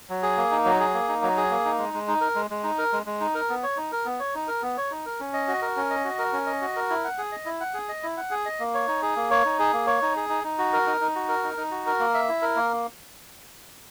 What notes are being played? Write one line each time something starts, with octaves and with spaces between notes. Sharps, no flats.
F#3
G#4
A#3
D#4
F#3
G#4
A#3
D#4
F#3
G#4
A#3
D#4
G#3
G#3
D#4
A#4
G#3
G#3
D#4
A#4
G#3
G#3
D#4
A#4
B3
C#5
D#4
A#4
B3
C#5
D#4
A#4
B3
C#5
D#4
A#4
C#4
D#5
F#4
A#4
C#4
D#5
F#4
A#4
C#4
D#5
F#4
A#4
E4
F#5
G#4
D#5
E4
F#5
G#4
D#5
E4
F#5
G#4
D#5
A#3
C#5
D#4
G#4
A#3
C#5
D#4
G#4
A#3
C#5
D#4
G#4
D#4
D#4
F#4
A#4
D#4
D#4
F#4
A#4
D#4
D#4
F#4
A#4
A#3
E5
E4
A#4
A#3